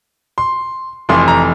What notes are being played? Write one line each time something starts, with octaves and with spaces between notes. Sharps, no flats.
C6
F1 F2 E3 C6
A#5